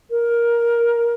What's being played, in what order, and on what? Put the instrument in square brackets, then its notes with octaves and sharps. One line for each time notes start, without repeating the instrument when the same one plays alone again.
[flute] A#4